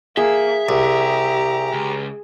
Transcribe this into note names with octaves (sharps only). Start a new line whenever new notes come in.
A#3 G#4 E5
C2 G4 A#5
C#2